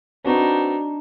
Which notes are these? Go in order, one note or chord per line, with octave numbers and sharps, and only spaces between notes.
C4 D4 D#4 F#4 B4